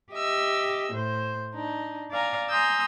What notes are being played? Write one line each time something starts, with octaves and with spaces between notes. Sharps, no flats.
G4 D#5 E5 E6
A2 C5
D4 D#4
D5 F5 G#5 A#5
G#5 A#5 C6 D#6 E6 G6